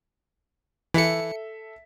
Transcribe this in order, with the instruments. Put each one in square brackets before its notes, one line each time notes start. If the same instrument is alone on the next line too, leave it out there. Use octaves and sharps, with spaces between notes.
[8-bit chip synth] E3 C#7 [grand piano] A4 E5 B6